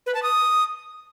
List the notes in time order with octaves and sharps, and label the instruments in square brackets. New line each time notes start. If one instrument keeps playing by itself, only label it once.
[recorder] B4
A5
D#6